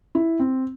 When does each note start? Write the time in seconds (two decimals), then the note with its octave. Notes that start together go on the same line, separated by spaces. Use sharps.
0.15 E4
0.39 C4